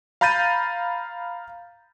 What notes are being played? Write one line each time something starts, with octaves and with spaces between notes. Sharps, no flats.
F5 A#5 B5 G6 A6 D#7